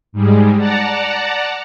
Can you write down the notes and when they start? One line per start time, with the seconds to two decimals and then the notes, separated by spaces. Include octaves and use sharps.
0.12 G#2 G3 G#3
0.56 D5 F#5 A5 A#5